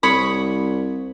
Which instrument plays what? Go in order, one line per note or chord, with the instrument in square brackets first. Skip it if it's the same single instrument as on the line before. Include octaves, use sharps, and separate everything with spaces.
[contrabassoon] C2 [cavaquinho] C#5 B5 D#6